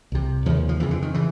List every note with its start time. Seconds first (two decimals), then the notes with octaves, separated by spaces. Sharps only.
0.12 C2 C3
0.46 D#2 C#3 F3
0.69 F3
0.80 F2 C#3 E3
0.91 D3
1.02 D#3
1.14 C#3 E3